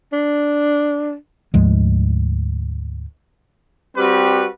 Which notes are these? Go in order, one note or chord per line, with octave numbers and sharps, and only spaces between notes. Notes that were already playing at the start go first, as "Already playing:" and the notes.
D4
D2 G#2 F3 G#3
G3 C4 F#4 G4 B4 D5